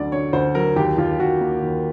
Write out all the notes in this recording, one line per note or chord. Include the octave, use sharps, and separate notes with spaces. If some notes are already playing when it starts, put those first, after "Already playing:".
Already playing: D2 D3 F#3 D5
D3 C#5
D2 C5
F#3 A#4
D#2 G4
D#2 F4
D#2 F#4
A#3
D#2